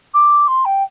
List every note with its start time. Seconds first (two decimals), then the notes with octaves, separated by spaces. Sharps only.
0.14 D6
0.48 C6
0.65 G5